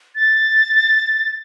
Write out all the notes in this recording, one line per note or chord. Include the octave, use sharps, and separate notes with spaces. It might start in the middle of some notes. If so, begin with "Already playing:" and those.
A6